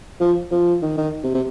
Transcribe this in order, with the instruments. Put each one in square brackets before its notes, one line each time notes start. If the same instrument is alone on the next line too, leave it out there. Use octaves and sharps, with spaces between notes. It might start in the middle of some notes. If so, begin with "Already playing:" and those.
[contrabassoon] F3
F3
D#3
D#3
C3
C3